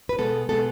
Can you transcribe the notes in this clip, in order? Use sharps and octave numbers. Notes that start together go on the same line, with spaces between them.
B4
B2 G#3 B3 A4
B2 G#3 B3 A4